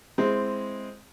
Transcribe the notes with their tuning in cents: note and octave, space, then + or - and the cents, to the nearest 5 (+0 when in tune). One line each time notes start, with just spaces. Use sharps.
G#3 +0 C4 +0 E4 +0